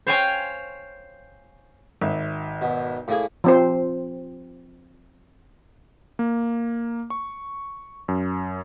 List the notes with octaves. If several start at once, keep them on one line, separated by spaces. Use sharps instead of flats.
C5 C#5 F5 G5 G#5 A#5
G#1 E5
B2
A2 A#3 G#4
F3 C4 C5
A#3
C#6
F#2